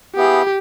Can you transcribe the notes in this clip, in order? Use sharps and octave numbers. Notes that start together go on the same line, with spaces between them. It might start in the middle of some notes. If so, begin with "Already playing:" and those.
B3 E4 G4 G#4